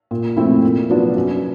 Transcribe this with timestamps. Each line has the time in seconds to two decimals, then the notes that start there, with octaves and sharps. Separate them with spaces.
0.11 A#2
0.36 F3 A3 C4 E4
0.64 A#2
0.89 F#3 B3 D4 F4
1.16 F#2